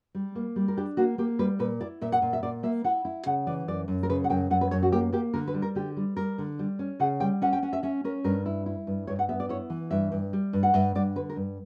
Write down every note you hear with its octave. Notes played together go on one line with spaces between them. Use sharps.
G3
A#3
G3
A#4
D4 G4
A#3 F#4
A#3 G4
G3 B4
A#2 B4
E4 D5
A#2 E5
F#5
A#2
E5
A#2 D5
A#3 E5
E4 F#5
E4
C#3 F#5
E3 D5
F#2 D5
F#2
A#4
C#3 B4
F#5
F#2 G5
F#2 F#5
B4
F#2 C#5
F#4
A#3 G4
A#3 G4
D3 A#4
B4
G3
A#4
D3 G4
G3
G3 A#4
D3
G3
C#4
C#3 F#5
G3 G5
C#4 F#5
G5
C#4 F#5
E5
C#4 E5
C#4 A#4
G2 A#4
E4
E4
G2
G2 C#5
F#5
B3 E5
D5
E4 C#5
E3
G2 E5
G2
G3
G2
F#5
G2 E5
G2 D5
D3 B4
A#4
G2